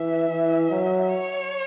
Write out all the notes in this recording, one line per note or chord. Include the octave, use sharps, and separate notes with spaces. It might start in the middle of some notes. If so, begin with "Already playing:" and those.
Already playing: E3 E5
E3
F#3
C#5